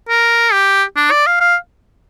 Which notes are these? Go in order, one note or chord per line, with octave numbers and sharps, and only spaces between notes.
A#4
G4
D4
D5
F5
F5